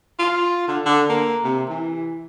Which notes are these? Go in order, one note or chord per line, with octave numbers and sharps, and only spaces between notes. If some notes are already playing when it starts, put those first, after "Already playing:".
F4
D3
D3
A#3
C3
E3